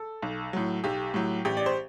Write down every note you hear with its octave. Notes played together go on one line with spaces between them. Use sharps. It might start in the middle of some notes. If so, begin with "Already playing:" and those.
Already playing: A4
B1
A2 F#3
B1 G4
A2 F#3
A1 G4
D5
C5